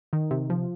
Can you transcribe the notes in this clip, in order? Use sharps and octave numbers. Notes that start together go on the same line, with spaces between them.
D#3
C3
F3